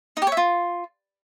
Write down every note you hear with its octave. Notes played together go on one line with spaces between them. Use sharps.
D#4
G4
C#5
E5
F4